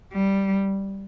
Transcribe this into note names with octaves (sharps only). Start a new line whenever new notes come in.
G3